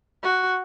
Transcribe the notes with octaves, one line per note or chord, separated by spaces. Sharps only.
F#4